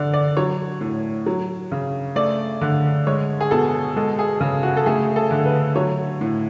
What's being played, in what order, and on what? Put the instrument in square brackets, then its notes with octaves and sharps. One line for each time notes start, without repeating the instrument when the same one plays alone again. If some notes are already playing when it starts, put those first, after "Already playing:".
Already playing: [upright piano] D3 D5
D5
F#3 C#5
A2
F#3
C#3
A3 D5
D3
G#3 C#5
G#4
B2 A4
G#3 A4
G#4
C#3
F#4
A4
A3 G#4
A4
D3
B4
F#3 C#5
A2